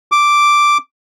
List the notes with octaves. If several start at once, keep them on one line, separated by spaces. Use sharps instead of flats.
D6